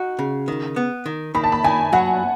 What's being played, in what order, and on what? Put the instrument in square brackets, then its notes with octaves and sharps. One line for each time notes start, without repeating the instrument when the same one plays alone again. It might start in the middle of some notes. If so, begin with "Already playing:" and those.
Already playing: [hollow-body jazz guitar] D#4 F#4
C#3
D#3
B3
D#3
[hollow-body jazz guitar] D#3 [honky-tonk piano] B5
[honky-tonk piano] A5
B5
[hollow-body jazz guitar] D#3 [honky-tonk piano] G#5
[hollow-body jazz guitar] F#3 [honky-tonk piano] F#5